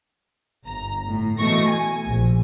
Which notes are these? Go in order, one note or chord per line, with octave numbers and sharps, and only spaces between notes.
G1 A#5
A2
B2 E3 A3 C#6 A#6
G#5
A#1